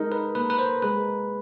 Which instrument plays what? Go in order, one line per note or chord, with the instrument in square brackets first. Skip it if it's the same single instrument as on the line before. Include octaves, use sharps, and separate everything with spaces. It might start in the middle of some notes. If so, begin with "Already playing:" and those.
Already playing: [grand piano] G#3 D#4 [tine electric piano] A4 A#4
[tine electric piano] B4
[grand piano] A#3 [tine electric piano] B4
[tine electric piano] B4
C5
[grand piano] G#3 [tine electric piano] B4